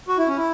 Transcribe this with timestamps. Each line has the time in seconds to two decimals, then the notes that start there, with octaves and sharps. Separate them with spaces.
0.08 F#4
0.18 E4
0.28 C#4
0.36 E4